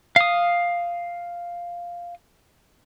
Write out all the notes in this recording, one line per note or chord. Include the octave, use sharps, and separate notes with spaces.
F5 D#6